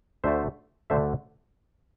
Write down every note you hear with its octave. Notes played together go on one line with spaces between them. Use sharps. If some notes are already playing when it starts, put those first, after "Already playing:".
D2 D3 A3 C5 E5
D2 D3 A3 C5 E5